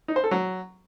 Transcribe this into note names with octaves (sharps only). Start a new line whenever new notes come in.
D#4
C5
A4
F#3